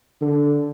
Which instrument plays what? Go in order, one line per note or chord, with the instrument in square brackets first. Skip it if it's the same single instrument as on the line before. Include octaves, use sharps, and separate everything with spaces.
[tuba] D3